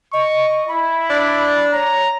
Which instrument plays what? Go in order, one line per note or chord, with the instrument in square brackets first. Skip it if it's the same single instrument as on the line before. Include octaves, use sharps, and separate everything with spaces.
[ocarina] D#5 [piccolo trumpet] C#6
[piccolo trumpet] E4 [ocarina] B5
[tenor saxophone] D4
[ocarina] C#5 [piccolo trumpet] A#5